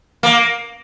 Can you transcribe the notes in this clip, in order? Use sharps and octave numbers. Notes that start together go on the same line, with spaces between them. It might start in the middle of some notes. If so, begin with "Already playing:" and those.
A#3